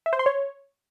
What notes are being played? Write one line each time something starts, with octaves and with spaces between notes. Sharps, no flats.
E5
C5
C6
C#5